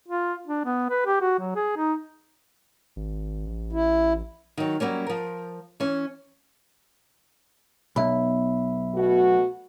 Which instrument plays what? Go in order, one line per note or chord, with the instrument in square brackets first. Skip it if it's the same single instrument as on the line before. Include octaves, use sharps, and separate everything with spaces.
[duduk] F4
D4
B3
B4
G4
F#4
F#3
G#4
D#4
[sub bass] G#1
A1
[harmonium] E4
[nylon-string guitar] D#3 F#3
F#3 G3 A#3 C#4
F3 A#4
E3 C#4
[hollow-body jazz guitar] B1 [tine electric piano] B3 E5 B5
[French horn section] B2 A3 F#4